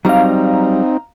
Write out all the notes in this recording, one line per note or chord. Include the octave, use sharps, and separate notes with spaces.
F#3 G3 C4 D#4 F5 A#5